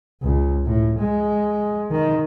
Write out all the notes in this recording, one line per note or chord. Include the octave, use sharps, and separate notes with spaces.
C#2
A2
G#3
D#3